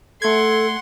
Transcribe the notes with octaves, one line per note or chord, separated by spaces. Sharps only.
A3 A4 F#5 C6 G#6